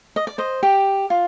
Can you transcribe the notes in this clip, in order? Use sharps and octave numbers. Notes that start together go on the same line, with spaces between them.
D#5
D5
C5 D#5
G4
F4